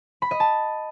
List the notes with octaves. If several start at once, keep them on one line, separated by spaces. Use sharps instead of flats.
B5
D#5
A5